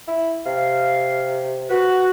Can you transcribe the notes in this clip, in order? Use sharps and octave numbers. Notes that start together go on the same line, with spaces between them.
E4
C3 F5
F#4 B4